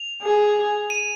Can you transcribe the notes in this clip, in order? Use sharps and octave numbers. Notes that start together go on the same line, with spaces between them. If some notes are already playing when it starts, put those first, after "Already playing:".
Already playing: F7
G#4
D#7